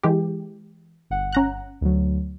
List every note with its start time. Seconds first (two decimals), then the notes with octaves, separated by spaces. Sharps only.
0.03 E3 G#3 G4
1.10 G1 F#5
1.33 C#4 A#5 F#6
1.81 D2 F#3